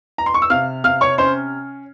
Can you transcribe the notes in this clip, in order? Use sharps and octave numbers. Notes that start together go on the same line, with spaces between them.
A#5
C6
C#6
E6
C3 F5 F6
C3 F5 F6
C#5 C#6
C#4 C5 C6